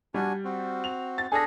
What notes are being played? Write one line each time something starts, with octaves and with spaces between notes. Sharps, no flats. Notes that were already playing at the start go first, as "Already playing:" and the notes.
G3 D4 F#4 G#5
C4 F#4
F7
A6
D4 G#4 A4 G#5 A#6